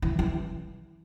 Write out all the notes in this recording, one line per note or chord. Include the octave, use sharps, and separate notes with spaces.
E3
E3